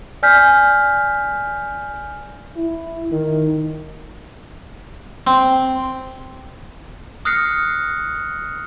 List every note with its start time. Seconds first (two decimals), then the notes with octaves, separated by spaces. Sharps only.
0.23 D5 G#5 F6 G6 B6
2.57 E4
3.12 D#3
5.27 C4
7.25 D#6 F6 F#6 A#6 C7 C#7